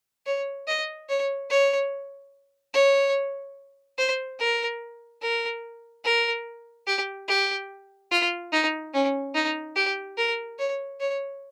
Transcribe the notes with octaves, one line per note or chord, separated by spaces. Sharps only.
C#5
D#5
C#5
C#5
C#5
C5
A#4
A#4
A#4
G4
G4
F4
D#4
C#4
D#4
G4
A#4
C#5
C#5